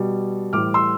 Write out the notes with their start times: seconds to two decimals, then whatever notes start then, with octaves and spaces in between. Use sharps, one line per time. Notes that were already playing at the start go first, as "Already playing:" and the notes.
Already playing: B2 G3
0.53 A2 E3 G3 D6 F6
0.74 C6 E6